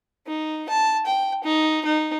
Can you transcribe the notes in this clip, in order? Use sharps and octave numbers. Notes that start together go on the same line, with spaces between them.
D#4
A5
G5
D#4
D#4